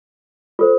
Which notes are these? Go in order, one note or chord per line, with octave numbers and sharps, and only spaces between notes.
F4 A4 C5